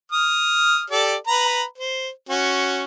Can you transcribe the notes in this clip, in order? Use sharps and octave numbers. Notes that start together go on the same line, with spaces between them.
D#6 F6
G4 A4 D5
B4 A#5 B5
C5
C#4 F#4